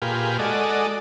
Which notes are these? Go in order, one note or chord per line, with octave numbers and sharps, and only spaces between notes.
A#2 F4 G4 G#4 B4
G#3 F#4 A4 D5 D#5